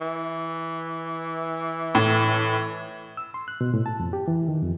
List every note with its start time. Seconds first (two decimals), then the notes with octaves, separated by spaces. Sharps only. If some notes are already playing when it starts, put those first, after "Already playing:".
0.01 E3
1.95 A2
3.17 E6
3.34 C6
3.48 F#6
3.61 B2
3.74 A2
3.86 A5
4.00 F2
4.13 G4
4.28 E3
4.48 D#3
4.62 F2